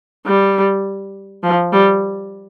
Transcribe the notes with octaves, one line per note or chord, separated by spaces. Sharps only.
G3
F3
G3